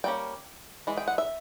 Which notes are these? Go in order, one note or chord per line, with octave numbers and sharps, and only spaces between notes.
G3 A#3 C#4 G5
E3 G#3
G5
F#5
E5